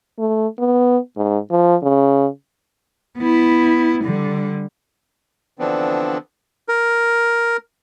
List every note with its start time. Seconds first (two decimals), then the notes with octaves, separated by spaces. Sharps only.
0.19 A3
0.59 B3
1.17 G#2
1.51 F3
1.82 C#3
3.18 B3 E4
4.04 D3 G3
5.59 D3 E3 F3 B3 C4 D4
6.68 A#4